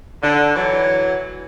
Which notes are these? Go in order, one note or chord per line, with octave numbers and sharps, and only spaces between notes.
D3
E3 F#3